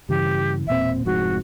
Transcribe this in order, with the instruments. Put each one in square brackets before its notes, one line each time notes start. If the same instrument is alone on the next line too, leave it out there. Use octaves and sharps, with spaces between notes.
[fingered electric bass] G2 C#3 E3 [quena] G4
[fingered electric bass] E1 A#2 C4 [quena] E5
[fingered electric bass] F1 F2 G#2 [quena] F#4